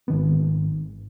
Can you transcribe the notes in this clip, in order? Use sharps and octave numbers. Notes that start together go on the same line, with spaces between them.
G#1 D#3 B3